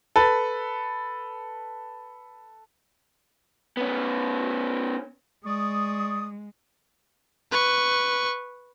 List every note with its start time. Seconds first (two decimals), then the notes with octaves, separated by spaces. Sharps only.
0.16 A4 B4
3.77 B3 C#4
5.44 G#3 D5 C#6 D#6
7.51 B4 C#6